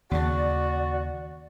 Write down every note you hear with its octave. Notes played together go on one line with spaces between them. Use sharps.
D#2 C#3 F#4 D5